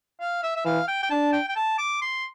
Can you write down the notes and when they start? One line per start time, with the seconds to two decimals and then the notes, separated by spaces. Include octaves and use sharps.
0.20 F5
0.43 E5
0.56 E5
0.65 E3 F5
0.88 G5
1.03 G5
1.10 D4 A5
1.33 G5
1.48 G5
1.56 A5
1.78 D6
2.01 C6